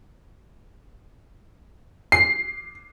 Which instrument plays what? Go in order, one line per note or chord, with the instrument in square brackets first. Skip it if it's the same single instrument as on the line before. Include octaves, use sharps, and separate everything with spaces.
[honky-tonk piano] C7